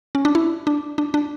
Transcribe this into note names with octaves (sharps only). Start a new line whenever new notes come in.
C#4
D4
E4
D4
D4
D4